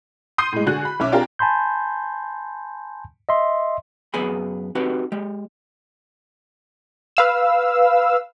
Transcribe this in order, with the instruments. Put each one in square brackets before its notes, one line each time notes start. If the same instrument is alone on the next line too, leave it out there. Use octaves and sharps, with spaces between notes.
[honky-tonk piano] C6 D#6 G6 C7 D#7
A2 G#3
D3 F#4 G#4 G#5 F#6
B5
B1 C#4 E5 D6
C4 D4 F4 G4 G#4 A#4
[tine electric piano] G#5 A5 B5 C6 G6
D#5 E5 C6
[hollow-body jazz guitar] F#2 B3 G#4 G#5 B5
C4 D#4 F#4 G4 B4
G#3 G4
[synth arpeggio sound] B4 F5 E6